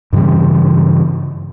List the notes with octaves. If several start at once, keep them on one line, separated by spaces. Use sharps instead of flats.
G2 C#3 E3 G3